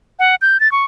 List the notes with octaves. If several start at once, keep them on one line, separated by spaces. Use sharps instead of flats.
F#5
G6
A6
C#6